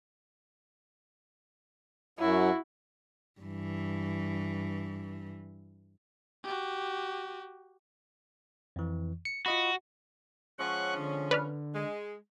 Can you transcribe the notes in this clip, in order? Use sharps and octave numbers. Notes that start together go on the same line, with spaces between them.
F#2 F#3 E4 F#4
G2 E3
F#4 G4
F2 E3
C#7
F4 F#4 D#5 B5
F3 G#3 C#4 F#5 C#6 F#6
D3
B4 D5 F6
G#3